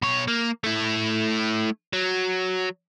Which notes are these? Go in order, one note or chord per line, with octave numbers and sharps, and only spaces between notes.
B2 C#5
A#3
A3 E4
F#3